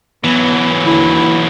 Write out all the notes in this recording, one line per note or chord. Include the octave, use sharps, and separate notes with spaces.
E3 F#3 B3
D#2 D3 E4